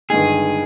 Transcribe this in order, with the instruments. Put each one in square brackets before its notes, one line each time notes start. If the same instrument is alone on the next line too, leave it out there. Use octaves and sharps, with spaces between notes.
[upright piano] G1 G2 D#3 G#3 D#4 [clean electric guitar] G#4